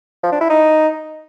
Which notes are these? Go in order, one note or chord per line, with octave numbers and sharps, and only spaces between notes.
F3
D4
E4
D#4